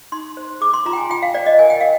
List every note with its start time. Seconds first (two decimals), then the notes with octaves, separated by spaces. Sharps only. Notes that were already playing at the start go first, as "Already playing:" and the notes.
0.12 D#4 C6
0.37 C5
0.61 G#4 D6
0.74 C6
0.86 F4 A#5
0.93 G5
0.98 G#5
1.10 F4 G5
1.22 F5
1.34 C5 D5
1.46 D#5
1.59 A#4 G#5
1.70 G5
1.81 A#4 F5